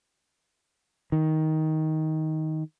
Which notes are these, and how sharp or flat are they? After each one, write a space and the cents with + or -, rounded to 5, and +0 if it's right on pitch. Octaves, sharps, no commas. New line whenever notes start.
D#3 +15